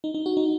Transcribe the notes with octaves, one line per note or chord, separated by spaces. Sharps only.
D#4
D#4
F#4
D#4